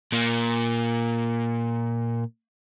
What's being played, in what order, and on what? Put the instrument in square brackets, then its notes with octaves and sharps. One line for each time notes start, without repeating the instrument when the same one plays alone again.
[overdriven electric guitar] A#2 A#3